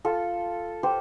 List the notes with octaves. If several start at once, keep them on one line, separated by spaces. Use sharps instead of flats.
F4 A4
G4 C5